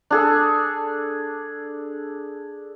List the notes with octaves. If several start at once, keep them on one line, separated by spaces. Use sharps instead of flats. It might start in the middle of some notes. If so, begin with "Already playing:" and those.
D4 G#4 A4